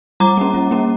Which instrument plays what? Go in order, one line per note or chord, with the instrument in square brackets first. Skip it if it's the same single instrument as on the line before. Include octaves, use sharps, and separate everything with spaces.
[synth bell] G3 A#5 D6
A#3 C#4
G3
A#3 C#4